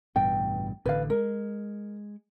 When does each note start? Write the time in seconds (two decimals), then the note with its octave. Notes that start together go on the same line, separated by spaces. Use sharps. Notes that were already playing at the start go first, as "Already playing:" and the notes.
0.16 A1 G2 B2 G5
0.86 A1 D3 B4 F5
1.10 G#3 A#4